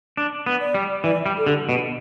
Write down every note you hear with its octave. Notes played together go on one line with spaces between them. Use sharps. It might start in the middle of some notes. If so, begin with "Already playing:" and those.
D4
B3
D5
G3
E3 D5
G3
A4
D3 G4
B2